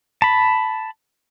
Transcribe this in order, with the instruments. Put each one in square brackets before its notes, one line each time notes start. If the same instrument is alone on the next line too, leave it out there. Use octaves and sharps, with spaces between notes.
[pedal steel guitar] A5 B5